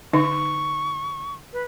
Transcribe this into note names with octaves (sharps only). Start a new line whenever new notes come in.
D3 D#4 C#6
B4